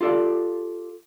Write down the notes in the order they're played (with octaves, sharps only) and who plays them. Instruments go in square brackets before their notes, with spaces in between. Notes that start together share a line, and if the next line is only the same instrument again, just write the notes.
[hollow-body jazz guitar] F4 G4 A4 D5 F5